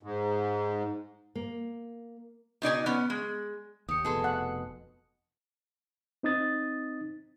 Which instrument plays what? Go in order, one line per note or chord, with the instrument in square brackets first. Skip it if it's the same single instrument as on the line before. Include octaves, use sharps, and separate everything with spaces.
[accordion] G#2
[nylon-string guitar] A#3
[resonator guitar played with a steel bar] B2 D#4 D5 G#5
B3 C#4
G#3
[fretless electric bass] D#2 [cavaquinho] G4 [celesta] D#6 C#7
[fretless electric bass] F1 B2 [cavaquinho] G#4 A4 C6
[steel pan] F#5
[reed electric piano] C4 D#4 D#6 A6